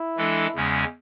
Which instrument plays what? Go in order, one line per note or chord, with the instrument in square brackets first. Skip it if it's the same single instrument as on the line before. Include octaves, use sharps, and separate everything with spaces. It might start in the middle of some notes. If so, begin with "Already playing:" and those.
Already playing: [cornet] E4
[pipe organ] E3 G#3 D4 A4
E2 C#3 G#3 C#4